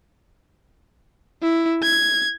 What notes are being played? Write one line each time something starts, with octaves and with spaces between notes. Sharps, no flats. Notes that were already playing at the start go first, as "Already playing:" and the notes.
E4
G#6